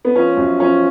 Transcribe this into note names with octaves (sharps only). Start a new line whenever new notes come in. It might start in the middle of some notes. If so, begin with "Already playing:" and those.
B3
F3 C#4
F#2
F3 C#4